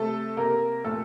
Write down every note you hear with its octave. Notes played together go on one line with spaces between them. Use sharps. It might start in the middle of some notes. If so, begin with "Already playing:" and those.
Already playing: C3 A3 A4
C3 A#3 A#4
A#2 A3 A4